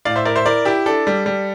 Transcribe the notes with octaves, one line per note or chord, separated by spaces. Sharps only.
A2 D5 F5
C5 E5
E4 A#4 D5
C5 E5
E4 A#4 D5
E4 G4
D4 A4
G3
G3